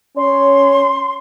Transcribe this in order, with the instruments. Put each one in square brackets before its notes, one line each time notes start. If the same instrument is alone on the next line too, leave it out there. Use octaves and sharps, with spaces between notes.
[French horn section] C#4 C#5 [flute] C6